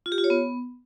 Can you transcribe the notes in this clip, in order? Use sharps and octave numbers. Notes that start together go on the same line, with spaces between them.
F4
G4
F4
C#5
B3